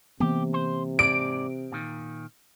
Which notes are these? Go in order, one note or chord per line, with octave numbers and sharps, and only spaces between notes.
C3 E3 A#3 B3 G4
C5
G#2 D5 D7
A#2 D#3